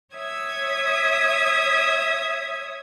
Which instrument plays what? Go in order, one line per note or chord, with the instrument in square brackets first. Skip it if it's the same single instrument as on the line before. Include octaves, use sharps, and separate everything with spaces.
[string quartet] C#5 E5 D#6 G#6